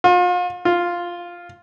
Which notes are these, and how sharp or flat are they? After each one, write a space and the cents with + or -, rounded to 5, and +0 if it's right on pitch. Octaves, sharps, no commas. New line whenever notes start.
F4 +40
F4 +0